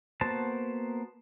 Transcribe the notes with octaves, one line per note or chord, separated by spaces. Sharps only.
A#3 B3 F#4 C5 A5